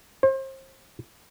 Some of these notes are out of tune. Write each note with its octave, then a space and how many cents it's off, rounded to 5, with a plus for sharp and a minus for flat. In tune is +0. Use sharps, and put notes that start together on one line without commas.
C5 +35